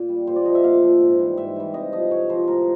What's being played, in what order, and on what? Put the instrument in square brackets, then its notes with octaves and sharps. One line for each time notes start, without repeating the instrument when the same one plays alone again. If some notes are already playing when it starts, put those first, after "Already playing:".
Already playing: [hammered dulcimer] A#2
G3
A#2 C5
D5
F3 D#5
E5
A#2 F5
F3
G#2
E3 G3
G#2 E5
E3 G3
C3 D#5
F3 D#5
C3 C#5
F3 C5
A2 A#4